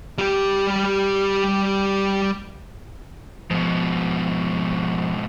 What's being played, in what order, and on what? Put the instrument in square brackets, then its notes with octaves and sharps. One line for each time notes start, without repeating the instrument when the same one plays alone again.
[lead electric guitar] G3 G4
[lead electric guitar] G#2 B2 [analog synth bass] F3